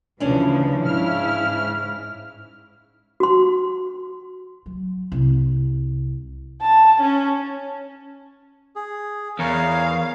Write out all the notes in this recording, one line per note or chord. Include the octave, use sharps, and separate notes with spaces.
D2 C#3 E3 F3 C#4 D4
G#2 C#3 E4 F6
F#4 C6
F#3
C2
A5
C#4
G#4
E2 G#4 A#4 C#5 F5